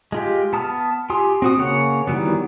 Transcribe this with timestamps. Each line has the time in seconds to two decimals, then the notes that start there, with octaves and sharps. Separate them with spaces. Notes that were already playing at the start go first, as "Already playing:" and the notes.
0.12 G#3 F4 G4
0.53 B3 A5 D#6 F6
1.10 F4 G4 G#5 C6 D#6
1.42 C4 F#4 D#6
1.59 C#3 A#3 C#5 F#5
2.07 D#3 E3 F#3 G3 B3